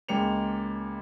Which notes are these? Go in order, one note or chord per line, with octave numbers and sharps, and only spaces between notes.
C#2 G#3 A#3 G5 C#7 F7